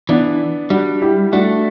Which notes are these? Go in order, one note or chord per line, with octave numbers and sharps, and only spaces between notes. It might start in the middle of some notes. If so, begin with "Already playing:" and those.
E3 B3 D4
G3 D4 F#4
E4 G4
A3 D4 F#4